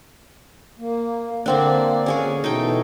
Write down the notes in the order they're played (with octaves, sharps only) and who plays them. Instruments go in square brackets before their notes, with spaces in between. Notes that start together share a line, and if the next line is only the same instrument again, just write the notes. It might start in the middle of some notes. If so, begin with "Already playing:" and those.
[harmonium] A#3
[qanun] D3 C4 D4 [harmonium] A#3 D5
[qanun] C#4 G#4 C#5
[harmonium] B2 E3 A4 [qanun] D#4 G5